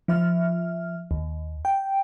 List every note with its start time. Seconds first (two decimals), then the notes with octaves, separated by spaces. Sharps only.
0.08 F3 E5 F6
1.11 D#2
1.65 G5